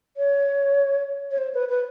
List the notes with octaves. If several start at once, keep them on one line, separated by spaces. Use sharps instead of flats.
C#5
C#5
C5
B4
B4